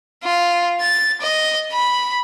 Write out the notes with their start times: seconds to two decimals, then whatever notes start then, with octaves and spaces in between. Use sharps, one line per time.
0.23 F4
0.81 A6
1.21 D#5
1.72 B5